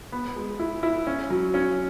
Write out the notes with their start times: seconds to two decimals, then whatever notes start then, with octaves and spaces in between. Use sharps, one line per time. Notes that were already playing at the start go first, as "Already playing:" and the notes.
0.12 B3
0.36 G#3
0.59 E4
0.83 E4
1.07 C#4
1.30 F#3
1.54 C#4